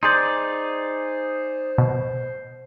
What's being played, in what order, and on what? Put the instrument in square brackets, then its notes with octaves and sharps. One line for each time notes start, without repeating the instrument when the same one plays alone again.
[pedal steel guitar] D#4 G#4 D5 [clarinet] C5 [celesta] C6 G6
[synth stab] B2